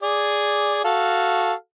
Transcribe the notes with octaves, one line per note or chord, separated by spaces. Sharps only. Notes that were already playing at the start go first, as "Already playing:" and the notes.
G#4 D5
F#4 A4 F5